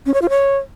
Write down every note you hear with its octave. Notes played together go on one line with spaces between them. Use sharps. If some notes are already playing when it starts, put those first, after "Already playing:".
C#4
C#5
F4
C#5